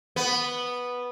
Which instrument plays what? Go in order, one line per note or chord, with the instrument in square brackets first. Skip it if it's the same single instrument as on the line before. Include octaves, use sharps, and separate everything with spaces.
[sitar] B3